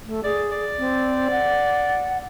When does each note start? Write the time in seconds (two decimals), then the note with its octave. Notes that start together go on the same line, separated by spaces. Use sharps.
0.06 A3
0.24 G#4 D5
0.52 D5
0.79 C4
1.31 F#5